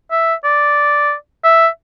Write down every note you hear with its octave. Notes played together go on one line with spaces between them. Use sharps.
E5
D5
E5